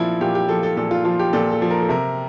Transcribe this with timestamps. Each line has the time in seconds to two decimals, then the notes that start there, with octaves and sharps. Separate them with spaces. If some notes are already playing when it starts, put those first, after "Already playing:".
Already playing: A#2 F3 E4
0.21 A#2 G4
0.35 G4
0.49 F3 A4
0.63 A4
0.77 A#2 A4
0.91 F4
1.05 F3 F4
1.19 G4
1.33 A#2 A4
1.52 A4
1.62 F3
1.71 A#4
1.81 A4
1.89 C3 A#4